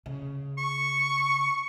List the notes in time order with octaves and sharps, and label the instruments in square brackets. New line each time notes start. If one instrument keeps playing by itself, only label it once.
[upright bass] C#3
[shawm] C#6